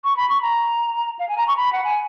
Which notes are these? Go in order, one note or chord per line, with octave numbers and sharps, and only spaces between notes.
C#6
B5
C#6
A#5
F5
G#5
A#5
C#6
B5
F#5
G#5